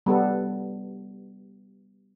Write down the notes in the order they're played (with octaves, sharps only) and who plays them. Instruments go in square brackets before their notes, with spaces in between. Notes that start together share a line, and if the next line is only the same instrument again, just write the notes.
[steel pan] G3 B3 A4